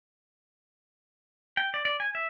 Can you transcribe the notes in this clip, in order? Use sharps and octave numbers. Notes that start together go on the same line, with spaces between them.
G5
D5
D5
G#5
E5